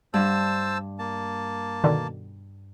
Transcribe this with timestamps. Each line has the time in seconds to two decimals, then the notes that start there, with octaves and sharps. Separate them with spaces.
0.14 G2 C5 A5 E6
0.99 A#3 A5
1.84 B2 D3 D#3